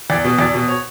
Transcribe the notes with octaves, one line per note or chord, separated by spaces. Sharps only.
E2 D5
B2
E2 D5
B2
C#5